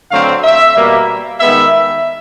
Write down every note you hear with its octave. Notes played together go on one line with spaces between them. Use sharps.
D3 F#3 A3 C4 F5
E5
B2 G3 A#3
D#3 G#3 B3 E5